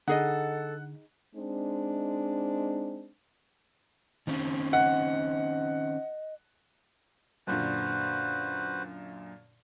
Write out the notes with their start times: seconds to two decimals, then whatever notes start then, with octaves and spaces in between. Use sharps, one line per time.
0.08 D3 D#4 G#4 A4 D#5 F#5
1.35 G#3 C4 D4 D#4
4.27 D#3 C4 C#4
4.73 D#5 F#5
7.47 F#2 A#2 D3 F#4 B4 C5